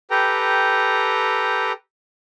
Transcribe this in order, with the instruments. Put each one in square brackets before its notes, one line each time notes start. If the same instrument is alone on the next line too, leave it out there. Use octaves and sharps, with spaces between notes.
[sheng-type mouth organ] G4 A4 B4 G5 A#5